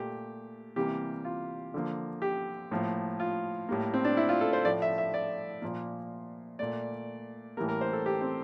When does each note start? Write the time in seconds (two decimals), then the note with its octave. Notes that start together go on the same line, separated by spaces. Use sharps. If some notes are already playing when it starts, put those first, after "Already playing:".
Already playing: A#2 A3 G4
0.76 C3 E3 G3 A#3 G4
1.25 F4
1.74 D3 F3 A#3
2.22 G4
2.71 A2 F3 A#3
3.20 F4
3.69 A2 G3 A#3
3.94 C4
4.05 D4
4.17 E4
4.29 F4
4.41 A4
4.53 C5
4.65 A2 F3 A3 D5
4.82 E5
4.98 E5
5.14 D5
5.62 A#2 F3 A#3
6.59 A#2 A3 D5
7.57 A2 E3 G3 A#3 A#4
7.69 A#4
7.81 C5
7.93 A4
8.06 G4
8.21 C4